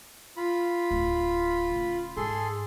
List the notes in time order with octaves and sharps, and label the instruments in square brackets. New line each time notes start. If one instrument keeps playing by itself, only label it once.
[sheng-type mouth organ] F4 B5
[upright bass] D1
C#3
[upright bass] G#2 [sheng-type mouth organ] G#4 A4 C6